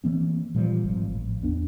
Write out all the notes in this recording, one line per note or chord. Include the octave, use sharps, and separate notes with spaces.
E3 A#3 C4
A#2 E3 F3 G3
G#1 F3
A1
E2 B3 D4